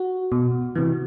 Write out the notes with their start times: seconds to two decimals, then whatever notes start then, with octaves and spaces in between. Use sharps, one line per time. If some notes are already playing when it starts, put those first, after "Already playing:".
Already playing: F#4
0.32 B2
0.76 C3 E3